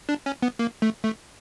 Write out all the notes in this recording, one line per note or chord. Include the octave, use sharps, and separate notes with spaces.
D4
C#4
B3
A#3
A3
A3